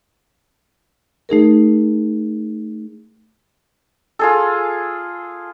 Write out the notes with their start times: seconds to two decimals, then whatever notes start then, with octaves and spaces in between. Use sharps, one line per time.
1.29 A3 D#4 G#4 A#4
4.19 F4 G#4 A4